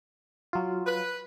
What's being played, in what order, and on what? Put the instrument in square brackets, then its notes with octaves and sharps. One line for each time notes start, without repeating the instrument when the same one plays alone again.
[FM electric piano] F#3 F4
[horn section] B4